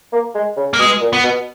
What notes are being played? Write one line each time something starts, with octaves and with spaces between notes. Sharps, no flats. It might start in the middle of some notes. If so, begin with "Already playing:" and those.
A#3
G#3
C#3
A#3
B2 G#3
A#2
B3
B2